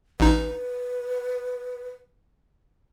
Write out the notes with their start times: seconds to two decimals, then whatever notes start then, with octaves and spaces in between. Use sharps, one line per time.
0.20 A1 D#4 B4